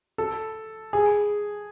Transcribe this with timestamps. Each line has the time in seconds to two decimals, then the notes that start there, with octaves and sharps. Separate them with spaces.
0.18 A4
0.93 G#4